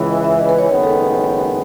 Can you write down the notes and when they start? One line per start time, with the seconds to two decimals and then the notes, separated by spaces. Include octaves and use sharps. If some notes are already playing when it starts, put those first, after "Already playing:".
Already playing: C#2 C#3 E3
0.09 D#5
0.24 E5
0.39 D#5
0.49 B4
0.59 C#5
0.69 F#1 F#2 D#3 G#3 B3 C#5
0.83 A4